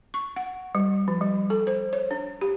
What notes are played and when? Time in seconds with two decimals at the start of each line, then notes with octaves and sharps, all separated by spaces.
0.14 C#6
0.36 F#5
0.75 G3
1.08 F3
1.21 G3
1.50 A4
1.67 C5
1.93 C#5
2.11 D4
2.41 G4